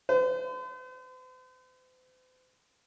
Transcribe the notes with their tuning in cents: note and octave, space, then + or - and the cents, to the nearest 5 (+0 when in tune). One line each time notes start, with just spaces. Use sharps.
C5 -45